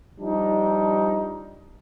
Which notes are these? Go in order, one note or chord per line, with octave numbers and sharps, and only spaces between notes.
F3 G3 D4 D#4